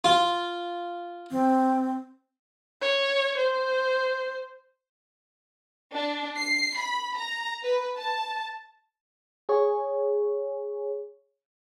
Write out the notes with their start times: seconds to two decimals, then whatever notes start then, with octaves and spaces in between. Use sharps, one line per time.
0.04 F4
1.31 C4
2.81 C#5
3.37 C5
5.93 D4
6.37 C7
6.78 B5
7.16 A#5
7.64 B4
7.97 A5
9.49 G#4 C#5